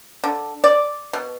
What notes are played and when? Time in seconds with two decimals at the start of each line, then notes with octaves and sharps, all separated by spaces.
0.24 D3
0.64 D5
1.13 B2